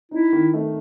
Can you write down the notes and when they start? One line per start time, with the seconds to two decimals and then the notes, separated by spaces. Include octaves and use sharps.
0.11 D#4 E4
0.33 D#3
0.54 A3